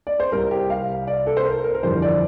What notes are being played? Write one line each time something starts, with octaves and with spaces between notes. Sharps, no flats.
D5
C5
C2 C3 G3 A#4
G4
F5
D5
A4
C5
A#4
A#4
A#4
G1 F2 E3 G3 C5
D5